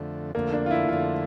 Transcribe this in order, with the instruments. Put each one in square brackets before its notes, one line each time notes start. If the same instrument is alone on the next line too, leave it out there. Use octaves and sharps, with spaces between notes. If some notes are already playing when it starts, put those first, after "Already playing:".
Already playing: [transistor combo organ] F2 D3 A3
[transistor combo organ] F2 D3 A3 [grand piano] A#3
[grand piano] D4
F4
E4
[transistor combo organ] F2 D3 A3 [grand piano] F4